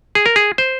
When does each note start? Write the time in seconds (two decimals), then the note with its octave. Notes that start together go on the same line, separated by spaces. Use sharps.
0.15 G#4
0.26 A#4
0.36 G#4
0.58 C5